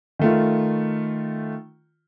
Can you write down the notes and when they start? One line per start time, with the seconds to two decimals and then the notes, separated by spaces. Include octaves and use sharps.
0.19 D#3 A3 F4